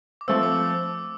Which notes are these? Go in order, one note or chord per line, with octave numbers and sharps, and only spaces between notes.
D6
F3 A3 C4 E6
D6